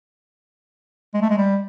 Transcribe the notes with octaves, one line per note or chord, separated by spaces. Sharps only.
G#3
A3
G#3
G3